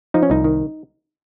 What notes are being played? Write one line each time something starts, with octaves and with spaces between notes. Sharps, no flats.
F3 D#4
C#4
C2 D#4
D#3